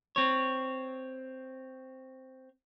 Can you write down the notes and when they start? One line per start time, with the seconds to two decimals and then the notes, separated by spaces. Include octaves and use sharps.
0.16 C4 C#5